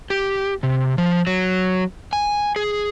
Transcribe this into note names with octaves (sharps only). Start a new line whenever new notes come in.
G4
C3
F3
F#3
G#5
G#4